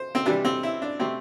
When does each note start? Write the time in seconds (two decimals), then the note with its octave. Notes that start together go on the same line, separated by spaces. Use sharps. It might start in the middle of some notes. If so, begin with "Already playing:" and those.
Already playing: C5
0.15 C4
0.26 C3 E3 G3 D4
0.45 C4
0.63 E4
0.82 D4
1.00 C3 A3 C4